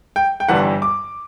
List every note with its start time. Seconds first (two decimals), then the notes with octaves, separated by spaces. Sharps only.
0.16 G5
0.40 G5
0.48 G1 G2 E3 G3 F#5
0.82 D6